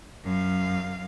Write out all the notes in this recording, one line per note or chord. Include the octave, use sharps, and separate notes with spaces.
F#2 F5